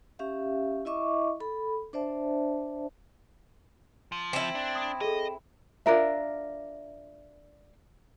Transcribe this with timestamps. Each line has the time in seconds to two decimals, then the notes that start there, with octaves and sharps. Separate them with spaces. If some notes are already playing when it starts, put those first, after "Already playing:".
0.19 C#4 G4 E5 F5
0.85 E4 D#5 E5 C#6 D6
1.40 A4 B5
1.93 D4 C5 D5 E5 A5
4.12 F3
4.33 C4 E4
4.55 D4
4.75 D#6
5.01 G#4 A4 D#5
5.86 D4 F4 A#4 E5